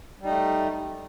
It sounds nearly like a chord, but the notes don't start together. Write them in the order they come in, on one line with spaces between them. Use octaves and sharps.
G3 D#4 A3